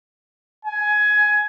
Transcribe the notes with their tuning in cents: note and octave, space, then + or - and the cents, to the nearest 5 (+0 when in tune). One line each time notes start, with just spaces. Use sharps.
G#5 +15